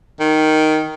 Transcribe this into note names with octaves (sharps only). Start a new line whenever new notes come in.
D#3